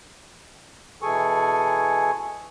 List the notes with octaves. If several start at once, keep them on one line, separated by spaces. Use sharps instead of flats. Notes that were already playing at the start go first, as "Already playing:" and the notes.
B2 E3 G#4 A4 G#5 C#6